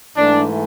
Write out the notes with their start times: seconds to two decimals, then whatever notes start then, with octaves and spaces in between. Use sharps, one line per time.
0.17 G#2 E3 A3 D4